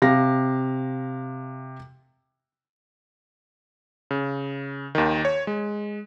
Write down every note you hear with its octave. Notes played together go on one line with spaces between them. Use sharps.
C3 F5 A#6
C#3
D#2 D#3
C#5
G#3